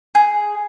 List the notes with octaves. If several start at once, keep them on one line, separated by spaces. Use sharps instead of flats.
G#4